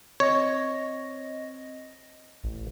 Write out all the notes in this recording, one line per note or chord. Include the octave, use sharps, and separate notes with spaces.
C4 C#5 D#5 A#6
A1